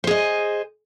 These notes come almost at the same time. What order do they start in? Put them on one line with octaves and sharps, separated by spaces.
C5 G#4 D#5